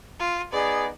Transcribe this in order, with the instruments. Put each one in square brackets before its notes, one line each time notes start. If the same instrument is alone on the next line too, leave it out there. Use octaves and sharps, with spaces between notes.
[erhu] F4
[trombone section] B3 D#4 G#4 [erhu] D5